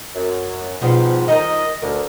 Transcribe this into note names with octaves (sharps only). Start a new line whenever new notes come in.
F#2
G#2 B2 F3 G3 B3
D#3 D#4 A#4 D#5
D2 A#4